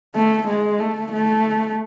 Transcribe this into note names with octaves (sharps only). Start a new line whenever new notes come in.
A3
G#3
A3
A3